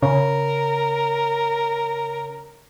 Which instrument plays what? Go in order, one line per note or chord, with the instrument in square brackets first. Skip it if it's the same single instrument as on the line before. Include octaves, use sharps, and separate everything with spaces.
[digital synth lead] C#3 [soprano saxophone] A#4